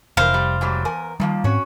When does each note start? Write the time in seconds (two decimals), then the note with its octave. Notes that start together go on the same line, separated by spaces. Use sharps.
0.17 F1 E3 A#4 C5 F5
0.34 G3
0.61 G#2 F#3 G3
0.85 E2 A#4 G#5
1.20 D#3 F3 G3 A#3
1.44 G#2 C4 C#4 F#4 C#5